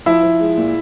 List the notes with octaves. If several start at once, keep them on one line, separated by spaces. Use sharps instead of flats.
F3 E4 E5
F3
G#3
A#2